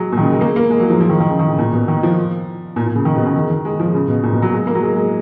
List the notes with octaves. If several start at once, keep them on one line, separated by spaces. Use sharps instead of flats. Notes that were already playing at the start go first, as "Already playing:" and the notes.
Already playing: F#3 G#3
A#2
D#3
C#3
G#3
A#3
A#3
G#3
F#3
F3
F3
D#3
D#3
C#3
D#3
C#3
A#2
B2
D#3
F3
A#2
A#2
C#3
D#3
B2
C#3
D#3
D#3
G#3
F3
C#3
B2
A#2
B2
F#3
G#3
A#3
F#3
G#3
G#3